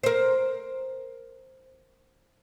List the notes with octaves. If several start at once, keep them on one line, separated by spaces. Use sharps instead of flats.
A#4 C5